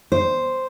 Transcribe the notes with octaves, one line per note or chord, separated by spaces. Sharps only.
C5